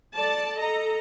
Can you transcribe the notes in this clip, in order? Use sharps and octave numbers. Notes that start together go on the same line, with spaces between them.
A4 D5 A5
A4 D#5 A#5